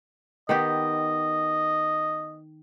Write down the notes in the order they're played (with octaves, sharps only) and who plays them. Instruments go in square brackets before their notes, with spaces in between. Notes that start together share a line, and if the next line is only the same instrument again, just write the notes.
[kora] D#3 B3 G4 [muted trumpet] D#5